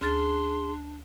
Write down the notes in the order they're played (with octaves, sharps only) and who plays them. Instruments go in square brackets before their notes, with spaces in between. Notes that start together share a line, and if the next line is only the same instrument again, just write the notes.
[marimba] D2 F6 A6 [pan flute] D4 [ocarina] G#4 [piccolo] C6